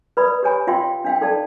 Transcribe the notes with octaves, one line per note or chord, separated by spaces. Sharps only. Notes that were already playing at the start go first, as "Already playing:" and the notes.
B4 D5 B5 D#6
G4 C#5 G#5 B5
F4 F5 G5 C6
D4 F5 G5
D#4 A4 D5 F5 A5